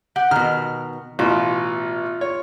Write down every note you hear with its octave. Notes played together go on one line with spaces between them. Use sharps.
G4 F#5
B2 D#3 F6
A1 B2 F4
C#5